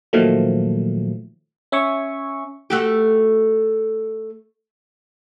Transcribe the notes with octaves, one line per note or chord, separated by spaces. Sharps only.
A#2 D#3 F3 F#3 A3
C#4 E5 G#5 C#6
A3 F#4 G4